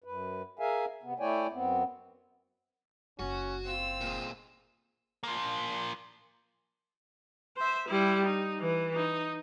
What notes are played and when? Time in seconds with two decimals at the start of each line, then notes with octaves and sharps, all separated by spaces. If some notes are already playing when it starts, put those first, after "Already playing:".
0.04 F#2 B4
0.59 G#4 A#4 E5 F5 G#5
1.03 C3 B3
1.20 A3 E4 C#5 D5 G5 G#5
1.52 F#2 B3 C4
3.19 F#1 C#4 F#4
3.65 C4 F4 E6
4.01 A#2 G#3
5.23 F3 A#3
7.57 C5 E5
7.89 G3 E4
8.25 D#4
8.60 E3
8.95 D#4